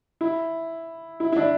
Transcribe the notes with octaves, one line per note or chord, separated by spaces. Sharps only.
E4
E4
E4
D4